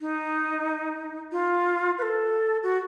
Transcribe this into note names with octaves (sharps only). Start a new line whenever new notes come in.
D#4
F4
B4
A4
F#4